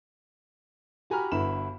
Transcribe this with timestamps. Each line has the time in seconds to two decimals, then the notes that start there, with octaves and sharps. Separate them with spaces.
1.10 F#4 G4 G#5 A#5 B5 F6
1.32 G1 E4 F#4 B4 B5 E7